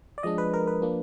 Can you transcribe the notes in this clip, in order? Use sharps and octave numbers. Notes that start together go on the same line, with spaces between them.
D5
F3 G#3 D4 D#5
B4
A#4
B4
F3 A#3 D4